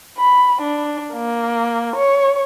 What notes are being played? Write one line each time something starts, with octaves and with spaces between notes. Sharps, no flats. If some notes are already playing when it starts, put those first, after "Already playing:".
B5
D4
A#3
C#5